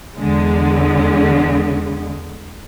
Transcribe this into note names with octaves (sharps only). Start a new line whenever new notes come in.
E2 D3 G#3